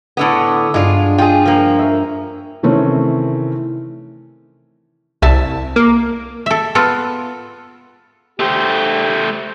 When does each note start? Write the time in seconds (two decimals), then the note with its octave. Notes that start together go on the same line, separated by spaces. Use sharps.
0.17 A2 D3 B3
0.74 G2 G#3 D4 F4
1.18 F4 G#4 G5
1.45 F3 A#3
1.79 A#4 C#5 E5
2.63 C3 D#3 E3 A3 C4 C#4
5.22 C2 E5 A5
5.76 A#3
6.46 A4 E5
6.75 B3 F4 A4
8.40 A3 G4 C5